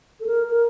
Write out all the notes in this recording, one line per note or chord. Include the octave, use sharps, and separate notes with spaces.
A4
A#4
A#4